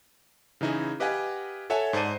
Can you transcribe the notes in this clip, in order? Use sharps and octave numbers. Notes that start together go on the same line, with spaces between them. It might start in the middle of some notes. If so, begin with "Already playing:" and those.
C#3 E3 D#4 E4 G#4
G4 B4 D#5 F5 F#5 G#5
A4 C#5 E5 F#5 G#5 A5
G#2 C5 D5 A5 D#7